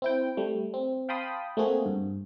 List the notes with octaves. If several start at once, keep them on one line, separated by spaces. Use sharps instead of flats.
C4 E4 G5
G3 A3
C4
F5 G5 A5 B5 C6 D#6
A3 A#3 C4 F#4 G#4
G2